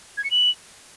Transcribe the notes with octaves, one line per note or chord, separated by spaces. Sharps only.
G#6
C#7
F#7